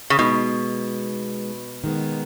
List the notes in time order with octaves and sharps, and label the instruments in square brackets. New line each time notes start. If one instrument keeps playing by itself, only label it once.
[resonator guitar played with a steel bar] C#3
[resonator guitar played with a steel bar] B2 [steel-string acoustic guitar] G#3 B3 D#4
[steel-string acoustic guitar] D#3 G#3 B3